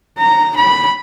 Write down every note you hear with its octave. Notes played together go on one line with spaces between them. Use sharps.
A#5
B5